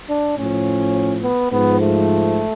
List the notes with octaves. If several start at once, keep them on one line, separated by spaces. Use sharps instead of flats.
D4
A2 F3 C#4
B3
G#2 F3 B3
A3